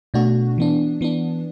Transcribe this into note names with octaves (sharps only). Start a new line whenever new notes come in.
B2 A3 D4 F#4
E3 B3 D4
E3 B3 D4